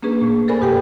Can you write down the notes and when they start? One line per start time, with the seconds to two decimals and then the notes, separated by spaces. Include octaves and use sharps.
0.03 A#3 C#4 D4 G#4 B4
0.21 A#2 A3
0.48 A4 A#4 C5 D5 G#5 B5
0.60 F#2 B2 G4 B4 G5